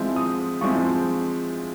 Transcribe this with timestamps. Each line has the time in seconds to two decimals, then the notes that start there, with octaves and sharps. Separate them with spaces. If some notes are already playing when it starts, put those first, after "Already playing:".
Already playing: F3 G#3 C4 E4
0.16 D#6
0.61 F3 G#3 C4 E4 C#6